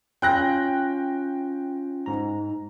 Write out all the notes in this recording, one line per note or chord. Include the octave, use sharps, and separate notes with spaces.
C#4 F4 G5 F#6 A#6
G#2 A#5